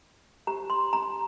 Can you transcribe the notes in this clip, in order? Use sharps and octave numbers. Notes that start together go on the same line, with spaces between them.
G4 C5 A#5
C6
A#5